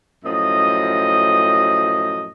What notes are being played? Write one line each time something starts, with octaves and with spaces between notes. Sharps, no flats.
F#2 A2 F3 D#5